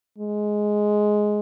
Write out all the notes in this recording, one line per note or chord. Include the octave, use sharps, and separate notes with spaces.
G#3